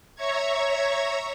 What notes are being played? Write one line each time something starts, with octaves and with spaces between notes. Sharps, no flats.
C#5 E5 A#5 C#6 G#6